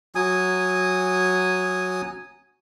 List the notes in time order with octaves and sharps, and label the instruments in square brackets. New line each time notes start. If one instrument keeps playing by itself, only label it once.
[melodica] F#3 G#5 D#6